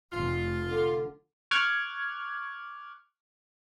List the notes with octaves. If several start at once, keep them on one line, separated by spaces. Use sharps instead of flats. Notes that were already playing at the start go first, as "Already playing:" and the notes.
F1 F4
D3
C#6 D6 F6 F#6 G#6